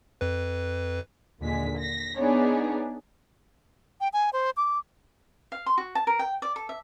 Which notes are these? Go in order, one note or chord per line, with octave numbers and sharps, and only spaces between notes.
F2 B4
D#2 A#2 D3 G#3 B6
A#6 B6
B3 D4 D#4 G#4 C#5 D5
G5
G#5
C5
D6
F5
C6
F#4
A5
A#4
G5
D5
A4
E5